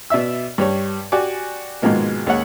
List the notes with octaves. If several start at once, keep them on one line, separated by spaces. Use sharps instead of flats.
B2 D5 E5 E6
G2 G3 C#5
F#4 G4 D5 G#5 D6
G#2 B2 D#3 F3 G#3 A#3
D#2 G#3 C#5 F#5